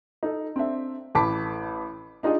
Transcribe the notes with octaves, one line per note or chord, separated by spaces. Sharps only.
D#4 A4
C4 D4 E5
A1 A2 A5 B5 D6 B6
D4 D#4 F4 G#4 D#5